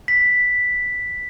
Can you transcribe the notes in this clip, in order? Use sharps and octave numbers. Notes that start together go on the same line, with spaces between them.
B6